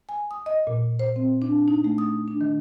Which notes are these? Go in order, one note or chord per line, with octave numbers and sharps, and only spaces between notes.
G#5
D#6
D#5
A#2
C5
C4
D4
D#4
A3
D#6
D4
D#3